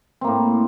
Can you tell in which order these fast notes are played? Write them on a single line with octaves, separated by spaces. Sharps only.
C4 A#3 A2